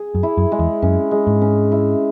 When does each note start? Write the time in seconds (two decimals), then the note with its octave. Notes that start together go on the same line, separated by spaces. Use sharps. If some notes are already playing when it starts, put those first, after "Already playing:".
Already playing: G#4
0.15 F#2
0.23 E4
0.37 F#2
0.52 G#3
0.59 E2
0.82 F#2 C#4
1.11 G#3
1.27 G#2
1.41 C#4
1.72 E4